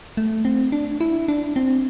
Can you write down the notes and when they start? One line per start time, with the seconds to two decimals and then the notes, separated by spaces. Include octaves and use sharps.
0.17 A3
0.45 C4
0.72 D4
1.01 E4
1.28 D4
1.56 C4